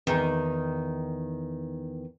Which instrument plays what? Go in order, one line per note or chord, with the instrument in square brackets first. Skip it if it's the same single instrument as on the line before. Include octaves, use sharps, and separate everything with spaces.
[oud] E2 D#3